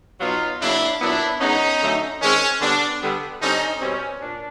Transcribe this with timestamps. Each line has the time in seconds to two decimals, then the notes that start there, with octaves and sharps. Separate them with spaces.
0.20 B2 F#3 B3 D#4 F4
0.60 C#3 F#3 A#3 C#4 D4 E4
1.00 A#2 F#3 B3 D4 E4
1.40 D#3 G#3 B3 C#4 D#4
1.80 D3 F#3 A3 C#4
2.20 D#3 G#3 C4 C#4
2.60 D3 G3 B3 D4
3.00 D3 G3 B3
3.40 D3 G3 C4 C#4 D#4
3.80 B2 G3 C4 C#4
4.20 A#2 D4